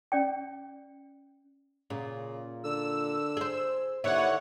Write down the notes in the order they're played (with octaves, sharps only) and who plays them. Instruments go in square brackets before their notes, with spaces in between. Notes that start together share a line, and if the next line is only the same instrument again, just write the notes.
[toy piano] C#4 D5 G5
[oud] A#2 [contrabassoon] C#3
[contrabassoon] D3 [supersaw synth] E6
[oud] G#4 C5
[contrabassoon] D#2 [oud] D3 E4 [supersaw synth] C#5 F#5